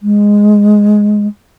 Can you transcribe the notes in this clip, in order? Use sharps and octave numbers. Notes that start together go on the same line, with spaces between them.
G#3